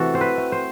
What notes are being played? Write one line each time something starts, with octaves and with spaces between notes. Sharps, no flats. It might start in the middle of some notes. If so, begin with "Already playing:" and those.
Already playing: C3 E3 A3 F#4 A4
C4 C5
B4
A3
C5